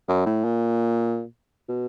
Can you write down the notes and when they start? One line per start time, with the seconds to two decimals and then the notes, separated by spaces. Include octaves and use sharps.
0.08 F#2
0.26 A2
0.44 A#2
1.68 B2